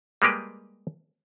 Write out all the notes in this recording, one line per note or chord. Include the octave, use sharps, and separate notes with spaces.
G3 G#3 A#3 G4 B4